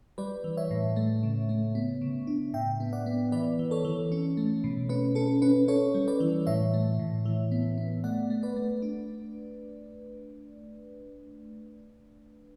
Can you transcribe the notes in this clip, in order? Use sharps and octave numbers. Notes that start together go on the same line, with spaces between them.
G3 B4 D5
E3
C#5 E5
A2
A3
C#3
A3
B3
C#3
D4
A2 E5 G5
B3
D5 F#5
B3
E3 B4 D5
E3
A4 C#5
E3
C#4
A3
B2
C#4 B4
C#4 A4
C#4 B4
C#4 A4 C#5
G3
B4 D5
E3
A2 C#5 E5
A3
A2
E3
B3
B3
A3 D5 F#5
A3
B4 D5
A3
D4